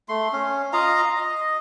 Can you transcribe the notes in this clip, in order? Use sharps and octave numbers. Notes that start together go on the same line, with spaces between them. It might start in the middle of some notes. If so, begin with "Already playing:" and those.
A3 C6
C#4
F4 D#5 F5 A#5
D#5